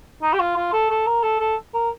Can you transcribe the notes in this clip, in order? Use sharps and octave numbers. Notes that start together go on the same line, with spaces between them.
D#4
G4
F4
F4
A4
A4
A#4
A4
A4
A#4